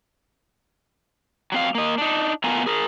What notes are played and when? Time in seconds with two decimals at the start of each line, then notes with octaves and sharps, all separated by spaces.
1.52 F#3 C4 F5
1.75 A#3 D#5
1.98 D4 D#4
2.44 A2 B3 F4 A#4 G#5 A#5
2.66 G#4 A#4